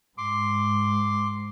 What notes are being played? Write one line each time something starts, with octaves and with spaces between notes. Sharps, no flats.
G#2 C6 D6